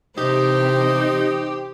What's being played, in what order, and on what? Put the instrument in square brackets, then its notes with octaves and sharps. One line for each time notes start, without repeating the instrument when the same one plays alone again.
[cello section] C3 E3 [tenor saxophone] D#4 [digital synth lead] G4 [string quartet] C5